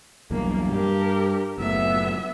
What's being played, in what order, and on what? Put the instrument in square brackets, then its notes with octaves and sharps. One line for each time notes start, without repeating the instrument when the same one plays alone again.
[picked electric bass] B1 E2 G2 [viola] A#3
[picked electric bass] G2 G3 [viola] G4 A#4
[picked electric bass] F#1 A2 [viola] B3 E5